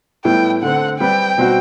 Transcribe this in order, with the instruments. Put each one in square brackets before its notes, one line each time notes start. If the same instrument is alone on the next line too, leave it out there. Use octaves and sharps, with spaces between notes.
[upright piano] A2 G3 B3 E4 [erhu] G5
[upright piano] D3 A3 C4 [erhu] F#5
[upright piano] G3 C4 G4 B4 [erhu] G5
[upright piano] B2 G3 C4 F#4